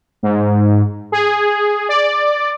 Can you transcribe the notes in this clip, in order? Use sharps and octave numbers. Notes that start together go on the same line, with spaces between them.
G#2
G#4
D5